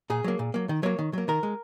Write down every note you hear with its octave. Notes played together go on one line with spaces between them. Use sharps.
A#2 G#4
F#3 A#3
A#2
F#3 A#3
D#3
F#3 A#3 C#5
D#3
F#3 A#3
D#3 A#4
G#3